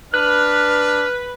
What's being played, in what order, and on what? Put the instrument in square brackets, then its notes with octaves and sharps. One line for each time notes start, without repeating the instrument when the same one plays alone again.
[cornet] D4 [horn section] B4 [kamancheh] F6 [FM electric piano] F#6